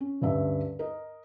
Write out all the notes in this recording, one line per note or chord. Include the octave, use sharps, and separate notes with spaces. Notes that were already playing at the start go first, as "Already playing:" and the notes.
C#4
D2 G2 C#4 E5
A#4 D#5